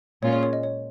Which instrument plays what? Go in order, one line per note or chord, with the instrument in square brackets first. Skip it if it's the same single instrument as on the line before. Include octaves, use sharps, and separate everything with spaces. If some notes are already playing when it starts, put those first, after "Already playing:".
[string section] A#2 G#3 C#4 F4 [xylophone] C#5
[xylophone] C#5
C#5
D#5
C#5